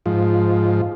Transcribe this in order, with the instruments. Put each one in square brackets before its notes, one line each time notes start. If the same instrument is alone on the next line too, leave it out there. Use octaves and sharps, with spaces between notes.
[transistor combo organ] G#2 F3